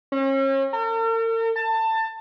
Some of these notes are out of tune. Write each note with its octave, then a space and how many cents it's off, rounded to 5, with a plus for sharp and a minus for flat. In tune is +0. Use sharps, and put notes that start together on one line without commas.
C#4 -40
A#4 -45
A5 +20